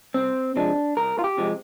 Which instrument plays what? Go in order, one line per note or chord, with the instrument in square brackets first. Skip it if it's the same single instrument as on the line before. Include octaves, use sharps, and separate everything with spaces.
[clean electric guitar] C2 C4
C3 F3 G#3 D4
C2 A#4
F4
G4
C3 F3 G#3